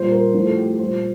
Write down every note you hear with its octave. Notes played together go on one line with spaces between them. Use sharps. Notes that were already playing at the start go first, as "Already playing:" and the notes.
Already playing: A#2 G3 C5
A#4
A2 F3 C5
A4
G4
G4
A#2 G3 C5